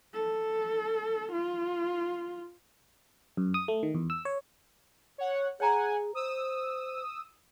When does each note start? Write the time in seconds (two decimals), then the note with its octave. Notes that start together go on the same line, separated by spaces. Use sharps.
0.14 A4
1.32 F4
3.37 F#2
3.54 D#6
3.68 A3
3.83 D#3
3.94 E2
4.10 E6
4.25 C#5
5.18 C#5 F#5
5.60 G#4 C#5 F#5 G#5 A#5
6.15 C5 D#6 E6